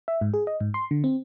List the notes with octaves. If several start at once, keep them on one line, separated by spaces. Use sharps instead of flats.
E5
G#2
G#4
D#5
G#2
C6
D3
C4